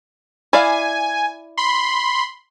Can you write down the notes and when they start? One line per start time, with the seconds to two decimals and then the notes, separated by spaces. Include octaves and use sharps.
0.53 E4 D5 F5 G#5
1.57 B5 C6